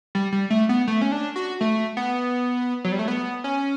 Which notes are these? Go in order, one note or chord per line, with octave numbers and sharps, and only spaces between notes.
G3
G3
A3
B3
A3
C#4
D4
F#4
A3
B3
F#3
G3
A3
B3
C#4